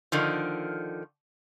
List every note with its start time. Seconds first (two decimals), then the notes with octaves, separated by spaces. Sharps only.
0.12 D3 D#3 F3